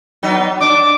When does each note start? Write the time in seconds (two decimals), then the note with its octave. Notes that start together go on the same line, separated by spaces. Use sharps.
0.23 F#3 B3 D#4
0.61 D4 D6